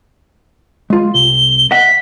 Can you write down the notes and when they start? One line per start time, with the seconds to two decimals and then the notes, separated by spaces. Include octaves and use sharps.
0.90 G#3 F4
1.14 C2 G7
1.71 D#5 E5 F#5 B6